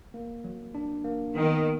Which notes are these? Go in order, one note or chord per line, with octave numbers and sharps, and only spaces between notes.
A#3
F#3
D4
A#3
D#3 B3